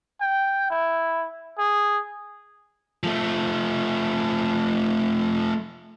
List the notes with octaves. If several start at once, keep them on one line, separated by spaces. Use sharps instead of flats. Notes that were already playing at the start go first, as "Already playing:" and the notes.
G5
E4
G#4
F3 A3